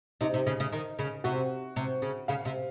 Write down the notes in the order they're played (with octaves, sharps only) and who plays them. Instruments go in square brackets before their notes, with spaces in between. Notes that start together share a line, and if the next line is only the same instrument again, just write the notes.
[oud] C3 [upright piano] D#4
[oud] C3
C#3
C#3
D#3
C#3
[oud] C3 [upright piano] F#4
[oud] C3
C#3
[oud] C#3 [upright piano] F5
[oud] C3